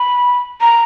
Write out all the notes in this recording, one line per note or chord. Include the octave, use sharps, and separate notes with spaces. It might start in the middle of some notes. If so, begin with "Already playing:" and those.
Already playing: B5
A#5